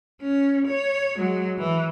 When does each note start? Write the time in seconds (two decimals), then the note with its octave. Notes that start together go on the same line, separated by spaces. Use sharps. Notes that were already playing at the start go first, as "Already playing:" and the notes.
0.22 C#4
0.68 C#5
1.17 F#3 G#3
1.58 E3